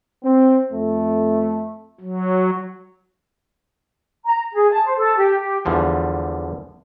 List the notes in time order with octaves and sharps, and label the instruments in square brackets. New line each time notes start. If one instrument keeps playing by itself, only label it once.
[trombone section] C4
F2 A3
[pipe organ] F#3
[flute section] A#5
G#4
A5
C5
A4
G4
G4
[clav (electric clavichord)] E2 D3 F3 G3